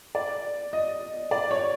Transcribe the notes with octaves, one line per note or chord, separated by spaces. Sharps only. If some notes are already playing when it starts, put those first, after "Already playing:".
D5
D#5
D5
C#5